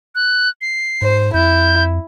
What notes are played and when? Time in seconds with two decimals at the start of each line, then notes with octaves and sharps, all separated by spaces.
0.15 F#6
0.61 C7
1.02 G#2 C5
1.34 F2 E4 G6